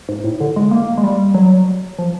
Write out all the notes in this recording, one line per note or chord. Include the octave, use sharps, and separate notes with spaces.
G#2
A2
D3
G#3
A#3
G#3
G3
F#3
F3